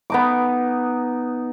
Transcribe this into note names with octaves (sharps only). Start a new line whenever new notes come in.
B3 D#4 D6